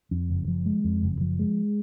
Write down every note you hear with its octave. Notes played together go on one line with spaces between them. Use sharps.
F2
F#1
F3
G#3
F2
F#1
F3
G#3